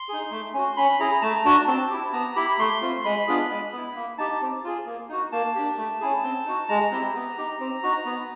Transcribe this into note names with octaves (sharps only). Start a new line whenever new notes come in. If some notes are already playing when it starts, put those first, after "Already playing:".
Already playing: C6
D#4 G#4
A3
C#4 F#4
C#4 B5
E4 G#4 A#5
A3 A5
A#5
D4 F#4 A5
C4 A5
E4 G4
B3 A#5
E4 G4 B5
A3 C6
C4 F4
G#3 B5
B3 D4 F4 G#4
G#3
B3 E4
A#3
D#4 G4 A5
C4
F4 G#4
A#3
D#4 F#4
A#3 A5
D4 G4
A3
C#4 E4 G#4
C4
D#4 F#4
G#3 A#5
C4 E4 G4
B3
D#4 G4
C4
D#4 F#4
B3